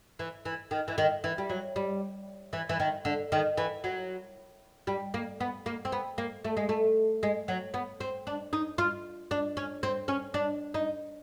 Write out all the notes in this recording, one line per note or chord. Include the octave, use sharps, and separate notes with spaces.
E3
E3
D#3
E3
D#3
E3
G3
F#3
G3
E3
E3
D#3
D3
D#3
E3
F#3
G3
A#3
B3
A#3
C4
B3
A#3
A3
G#3
A3
G#3
F#3
B3
C4
D4
D#4
F4
D4
C#4
C4
C#4
D4
D#4